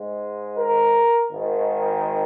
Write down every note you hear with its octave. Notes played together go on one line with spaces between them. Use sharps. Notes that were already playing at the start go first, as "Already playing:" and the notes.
Already playing: G#2 G#3
A#4
G#1 G#2 D#3